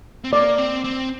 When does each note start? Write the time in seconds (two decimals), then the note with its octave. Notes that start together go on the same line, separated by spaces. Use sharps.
0.24 C4
0.32 A#3 D5
0.58 C4
0.84 C4